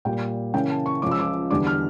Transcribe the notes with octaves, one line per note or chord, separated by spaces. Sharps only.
A#2 G3 A#3 G5
C#3 E3 A#3 C#4 G5
A5
C#6
C#2 C#3 F3 C#4 D6
E6
D6
E2 D3 G3 D4 D6
F6